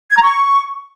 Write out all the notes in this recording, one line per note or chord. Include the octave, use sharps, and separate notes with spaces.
G#6
A#5
C#6